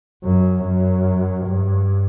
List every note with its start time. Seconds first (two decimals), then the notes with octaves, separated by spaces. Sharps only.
0.24 F#2
0.64 F#2
1.46 G2